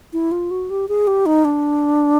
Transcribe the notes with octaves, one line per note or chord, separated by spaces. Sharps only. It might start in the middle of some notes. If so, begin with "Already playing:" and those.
E4
F4
F#4
G4
G#4
G4
D#4
D4